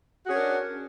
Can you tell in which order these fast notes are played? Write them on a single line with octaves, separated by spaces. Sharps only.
F#4 G#4 C#4 A#4 D4